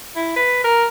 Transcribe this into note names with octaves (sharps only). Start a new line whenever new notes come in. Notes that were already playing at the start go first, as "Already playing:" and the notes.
E4
B4
A#4